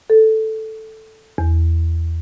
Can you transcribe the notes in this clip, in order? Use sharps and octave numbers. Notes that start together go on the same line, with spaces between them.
A4
E2